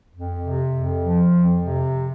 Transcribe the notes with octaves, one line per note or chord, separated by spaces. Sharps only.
F2
C3
F2
F3
F2
C3